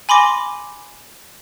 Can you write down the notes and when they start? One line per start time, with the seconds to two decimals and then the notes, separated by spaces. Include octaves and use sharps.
0.09 G#5 B5 C6 D6 A#6